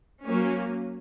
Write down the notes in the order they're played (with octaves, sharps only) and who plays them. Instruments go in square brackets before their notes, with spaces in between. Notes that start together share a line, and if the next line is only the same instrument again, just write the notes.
[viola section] F#3 A#3 C#4